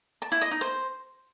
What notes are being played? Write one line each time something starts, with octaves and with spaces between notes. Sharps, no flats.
A5
E4
D#5
D#4
C5